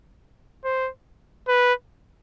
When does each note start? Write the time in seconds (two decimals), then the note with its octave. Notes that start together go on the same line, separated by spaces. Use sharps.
0.64 C5
1.48 B4